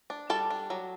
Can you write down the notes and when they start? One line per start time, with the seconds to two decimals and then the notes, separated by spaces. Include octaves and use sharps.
0.10 D4
0.30 G3 A4 A5
0.50 D4
0.70 F#3